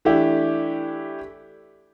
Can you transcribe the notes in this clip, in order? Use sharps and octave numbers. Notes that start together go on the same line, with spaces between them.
E3 A3 D4 E4 G4